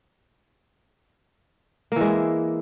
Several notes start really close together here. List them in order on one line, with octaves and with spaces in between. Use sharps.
A#3 E3 G#3 E4